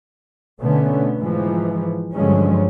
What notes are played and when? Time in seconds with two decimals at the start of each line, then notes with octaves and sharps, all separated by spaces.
0.59 B2 D3 A3 B3 C#4
1.17 G#2 E3 F3
2.13 G2 D3 F3 F#3 G#3 C#4